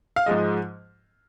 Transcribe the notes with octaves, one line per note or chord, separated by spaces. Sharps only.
F5
G#2 F3 G#3 D#5